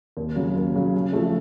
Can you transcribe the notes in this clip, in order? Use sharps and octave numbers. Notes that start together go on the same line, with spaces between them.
D#2
C#3 F#3
D#2
C#3 F#3
C#3
F3 A3